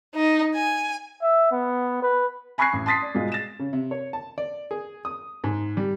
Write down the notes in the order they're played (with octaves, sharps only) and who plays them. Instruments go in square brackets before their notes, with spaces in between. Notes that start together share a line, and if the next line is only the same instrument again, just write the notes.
[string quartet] D#4
G#5
[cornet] E5
B3
B4
[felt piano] G#5 B5 C#6 F#6 G#6 C7
A1
A5 C6 D#6 A6 B6 C7
D5
G#2 B2 G#3 F4
A6 E7
[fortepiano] C#3
C3
C#5
A5
D5
G#4
D#6
G#2
G3